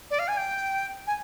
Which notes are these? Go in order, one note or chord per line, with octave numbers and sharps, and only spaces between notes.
D5
F5
G#5
G5
G#5